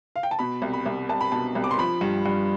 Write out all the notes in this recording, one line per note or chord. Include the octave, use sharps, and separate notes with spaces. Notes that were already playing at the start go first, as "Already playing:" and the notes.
F5
G5
A5
B2 B5
C2
B5
C2
C2 A5
B5
B2 A5
C2
D6
C6
F3 B5
G2
G2